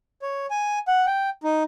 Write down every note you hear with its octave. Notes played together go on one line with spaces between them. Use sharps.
C#5
G#5
F#5
G5
D#4